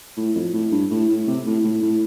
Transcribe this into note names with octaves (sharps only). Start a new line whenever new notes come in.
A2
F2
A2
G2
A2
A2
C3
A2
A2
A2